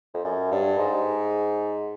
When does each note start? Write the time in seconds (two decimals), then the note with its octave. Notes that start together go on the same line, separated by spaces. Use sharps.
0.14 F2
0.24 F#2
0.52 G2
0.79 G#2